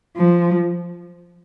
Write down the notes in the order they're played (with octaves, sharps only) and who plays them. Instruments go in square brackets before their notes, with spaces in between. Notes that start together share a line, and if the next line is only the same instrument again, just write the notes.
[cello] F3